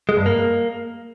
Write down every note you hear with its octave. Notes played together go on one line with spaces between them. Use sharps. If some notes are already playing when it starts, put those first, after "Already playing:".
G#3
G2
A#3